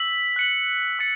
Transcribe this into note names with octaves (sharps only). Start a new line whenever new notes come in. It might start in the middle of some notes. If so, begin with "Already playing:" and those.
Already playing: E6 B6 F#7
F#6 C#7 F#7
E6 A6 C#7